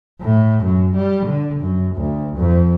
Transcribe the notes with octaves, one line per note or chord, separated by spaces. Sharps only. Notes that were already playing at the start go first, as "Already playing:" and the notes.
A2
F#2
G3
D3
F#2
D2
F2